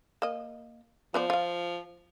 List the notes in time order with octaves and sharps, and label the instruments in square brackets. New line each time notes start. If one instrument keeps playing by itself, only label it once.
[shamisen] A#3 D#5
[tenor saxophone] F3 [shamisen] B3 C5 D5
[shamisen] F4 F5